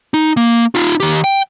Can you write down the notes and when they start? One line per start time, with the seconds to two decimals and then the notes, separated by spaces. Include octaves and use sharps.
0.14 D#4
0.37 A#3
0.75 D#4 F4
1.00 D#3 G4
1.24 G5